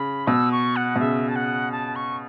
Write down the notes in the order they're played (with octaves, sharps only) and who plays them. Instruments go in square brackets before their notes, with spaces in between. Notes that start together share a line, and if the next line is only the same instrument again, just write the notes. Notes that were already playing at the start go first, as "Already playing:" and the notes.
Already playing: [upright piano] C#3 [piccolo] B5
[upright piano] B2 [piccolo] E6
[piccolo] C#6
F#5
[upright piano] B2
[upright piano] C#3 [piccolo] E5
[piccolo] A5
F#5
A5
C#6